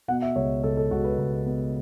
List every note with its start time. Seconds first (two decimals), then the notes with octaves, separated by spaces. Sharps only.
0.08 B2 F#5
0.22 E5
0.36 C#2 C#5
0.63 C#2 A4
0.77 A4
0.91 C#2 F#4
1.04 B4
1.18 C#2
1.46 B3